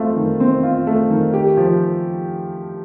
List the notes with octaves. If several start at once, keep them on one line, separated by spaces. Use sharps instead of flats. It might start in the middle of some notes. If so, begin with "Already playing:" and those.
Already playing: A3 C4 F4
D#3
C4
F4
A3
D#3
G4
F3